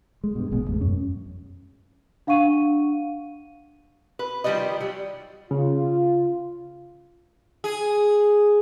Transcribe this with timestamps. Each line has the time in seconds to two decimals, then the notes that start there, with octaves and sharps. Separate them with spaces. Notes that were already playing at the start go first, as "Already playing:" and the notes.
0.24 G#3
0.35 G2 B2
0.52 A1 B2 G#3
0.65 D#1 A1 E2
0.81 F#2 C#4
2.27 D4 F5 F#5 C#6 D#7
4.19 B4
4.44 D#3 F3 G3 G4 D5 D#5
4.80 F#3 G3
5.51 C#3 F4
7.64 G#4